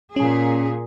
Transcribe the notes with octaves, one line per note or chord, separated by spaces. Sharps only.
A#2 C#4 G#4